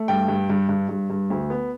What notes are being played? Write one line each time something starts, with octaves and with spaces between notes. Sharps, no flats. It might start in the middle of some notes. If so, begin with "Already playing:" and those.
Already playing: A3
G2 G5
G2
G2
G2
G2
G2
D2
B3